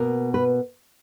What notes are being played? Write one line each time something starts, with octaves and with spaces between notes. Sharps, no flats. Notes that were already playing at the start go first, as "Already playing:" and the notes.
Already playing: B2 A#3 A#4
B4